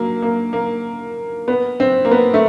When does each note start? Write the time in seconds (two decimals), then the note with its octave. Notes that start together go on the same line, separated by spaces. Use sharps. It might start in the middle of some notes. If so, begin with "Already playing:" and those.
Already playing: F#3 A#3
0.22 A#3
0.53 A#3
1.48 B3
1.80 C4
2.05 A#3
2.11 B3
2.34 A3